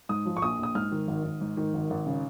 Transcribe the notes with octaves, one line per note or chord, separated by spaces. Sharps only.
G#2 D#6
F3
C#6
A#1 D#6
A#1 D#6
G#2 F6
D#3
G#1
G#1
G#2
D#3
G#1
G#1
C#3